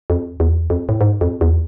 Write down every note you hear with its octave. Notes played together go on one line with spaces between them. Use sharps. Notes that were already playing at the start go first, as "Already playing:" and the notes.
F2
E2
F2
A2
G#2
F2
E2